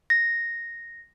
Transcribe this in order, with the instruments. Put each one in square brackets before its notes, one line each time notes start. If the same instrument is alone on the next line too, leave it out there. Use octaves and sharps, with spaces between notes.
[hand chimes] A#6